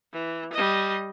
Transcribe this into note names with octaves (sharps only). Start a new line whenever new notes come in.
E3
G3 D#5